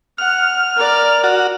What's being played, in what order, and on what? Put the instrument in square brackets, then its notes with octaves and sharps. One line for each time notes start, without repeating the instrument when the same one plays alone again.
[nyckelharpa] F#5 [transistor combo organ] F6
[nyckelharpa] A#4 D5
[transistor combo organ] F#4